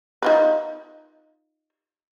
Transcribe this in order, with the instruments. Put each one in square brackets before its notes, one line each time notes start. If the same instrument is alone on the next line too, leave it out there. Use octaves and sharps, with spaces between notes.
[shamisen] D#4 F4 B4